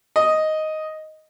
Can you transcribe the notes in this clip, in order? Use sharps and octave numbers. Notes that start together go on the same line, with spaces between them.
D#5